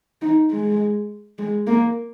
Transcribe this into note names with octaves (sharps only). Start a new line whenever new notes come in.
D#4
G#3
G#3
A#3